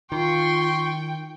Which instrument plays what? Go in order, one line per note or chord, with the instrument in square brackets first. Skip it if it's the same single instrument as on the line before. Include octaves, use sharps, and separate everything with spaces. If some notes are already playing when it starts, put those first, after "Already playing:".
[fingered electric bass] D#3 [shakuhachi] F4 [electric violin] G5 [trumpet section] C6 C#6